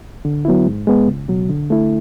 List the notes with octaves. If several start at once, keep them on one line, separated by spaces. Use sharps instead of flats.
D3
F#3 B3 E4
G#2
G#3 B3
C#2
B2 F#3
D3
A3 E4